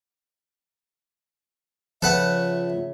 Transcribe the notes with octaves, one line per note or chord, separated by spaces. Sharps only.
C#3 F3 A4 B4 E5 F#5